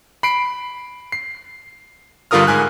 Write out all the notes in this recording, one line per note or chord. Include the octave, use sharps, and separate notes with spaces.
B5 C7 D7
C7
G2 D3 F4 A#4 D#6 F6
G#2 G#5 F#6